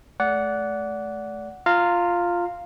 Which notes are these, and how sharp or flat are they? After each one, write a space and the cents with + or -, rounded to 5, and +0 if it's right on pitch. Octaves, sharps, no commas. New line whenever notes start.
A3 -30 D5 -25 F#5 +0
F4 +0 F5 +0 A#5 -25